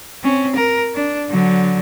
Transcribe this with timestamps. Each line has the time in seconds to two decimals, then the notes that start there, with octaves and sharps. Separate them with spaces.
0.23 C4 C#4
0.56 A#4
0.95 D4
1.30 D3 F#3